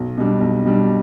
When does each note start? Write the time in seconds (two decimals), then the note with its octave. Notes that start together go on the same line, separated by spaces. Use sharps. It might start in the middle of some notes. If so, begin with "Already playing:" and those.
Already playing: B1
0.18 B2 G3 D4
0.41 B1
0.66 B2 G3 D4